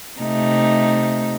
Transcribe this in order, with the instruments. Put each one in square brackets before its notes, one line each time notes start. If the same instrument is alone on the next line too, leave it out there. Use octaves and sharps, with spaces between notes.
[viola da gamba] C3 A3 D#4